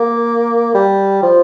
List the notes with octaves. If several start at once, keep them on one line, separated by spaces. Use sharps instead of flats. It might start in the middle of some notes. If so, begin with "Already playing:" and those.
Already playing: A#3
G3
F3